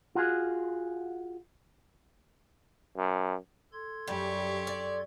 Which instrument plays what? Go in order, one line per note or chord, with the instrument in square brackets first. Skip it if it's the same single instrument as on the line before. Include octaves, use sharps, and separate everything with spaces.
[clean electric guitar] F4 F#4 G#4
[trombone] F#2
[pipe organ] A4 C6 G#6
[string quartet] F#2 G4 C#6 [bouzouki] G3
[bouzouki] D5